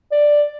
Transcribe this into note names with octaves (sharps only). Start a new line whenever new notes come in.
D5